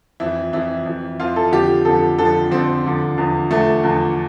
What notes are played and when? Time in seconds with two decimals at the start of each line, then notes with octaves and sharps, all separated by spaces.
0.20 F2 E3 E4
0.53 F2 E3 E4
0.86 F2 E3
1.20 F2 E3 F4
1.36 A4
1.52 F2 D3 F3 G4
1.85 F2 D3 F3 A4
2.18 F2 D3 F3 A4
2.51 F2 D3 F3 C4
2.85 E2 D3 F3
3.17 E2 D3 F3
3.51 E2 D3 F3 A3
3.83 E2 D3 F3